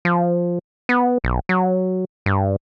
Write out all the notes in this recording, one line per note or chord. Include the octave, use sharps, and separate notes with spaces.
F3
B3
B1
F#3
G2